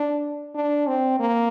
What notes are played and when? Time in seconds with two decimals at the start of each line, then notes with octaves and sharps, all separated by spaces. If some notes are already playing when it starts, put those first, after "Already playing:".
Already playing: D4
0.55 D4
0.87 C4
1.20 A#3